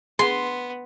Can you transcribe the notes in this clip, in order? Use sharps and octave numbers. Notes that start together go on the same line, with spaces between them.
B3 G#4 C6